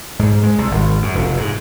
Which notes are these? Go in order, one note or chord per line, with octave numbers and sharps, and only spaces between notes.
G#2
G#3
C2
G#1
F#2
F1
G#2